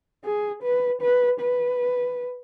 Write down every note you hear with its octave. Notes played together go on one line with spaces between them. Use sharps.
G#4
B4
B4
B4